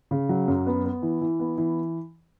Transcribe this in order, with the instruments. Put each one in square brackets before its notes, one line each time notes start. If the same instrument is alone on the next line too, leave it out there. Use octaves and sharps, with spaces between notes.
[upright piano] C#3
F#3
F#2
B3
B3
E3
E3
B3
E3